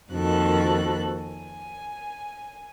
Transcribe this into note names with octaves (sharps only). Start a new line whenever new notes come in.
F2 D#3 A#3 F#4 A4 F#6
G#5